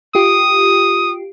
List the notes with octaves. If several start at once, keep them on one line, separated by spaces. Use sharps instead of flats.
F4 G4 D#6